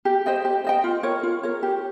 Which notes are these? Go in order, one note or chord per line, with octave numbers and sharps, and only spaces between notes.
G4
C5 D#5 G5
G4
C5 D#5 G5
F4
A#4 C#5
F4
A#4 C#5
G4